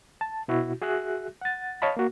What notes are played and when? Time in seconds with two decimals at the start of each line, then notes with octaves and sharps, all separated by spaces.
0.21 A5
0.48 B2 E4 F#4
0.81 F#4 G#4 E5 F#6
1.41 F#5 A6
1.82 C#5 D#5 F5 A5 B5
1.97 A#3 F#4